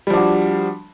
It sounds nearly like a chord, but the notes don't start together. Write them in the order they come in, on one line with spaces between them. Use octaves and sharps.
G3 F3 D4 F#4